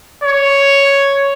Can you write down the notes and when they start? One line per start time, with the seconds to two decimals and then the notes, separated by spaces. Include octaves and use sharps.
0.24 C#5